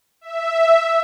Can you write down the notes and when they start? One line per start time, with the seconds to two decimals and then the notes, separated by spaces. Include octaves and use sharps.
0.21 E5